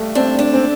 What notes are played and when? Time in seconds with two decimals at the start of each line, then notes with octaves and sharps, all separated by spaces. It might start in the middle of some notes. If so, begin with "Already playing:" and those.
Already playing: G2 A3
0.15 C4 D4
0.39 D4
0.53 C4